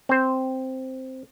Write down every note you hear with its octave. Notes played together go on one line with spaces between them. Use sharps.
C4 C5